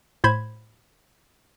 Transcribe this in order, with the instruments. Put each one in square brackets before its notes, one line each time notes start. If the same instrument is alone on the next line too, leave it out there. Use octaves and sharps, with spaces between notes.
[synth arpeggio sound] A2 C5 B5 G#6